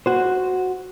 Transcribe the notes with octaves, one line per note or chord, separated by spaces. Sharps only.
F#4 C5